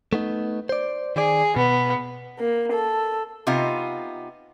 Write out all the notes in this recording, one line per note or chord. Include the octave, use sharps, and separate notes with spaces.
A3 B3 D#4
C5 D5
D#3 G#4 D5
B2 B3
A#3
A4
C3 B3 D#4 F4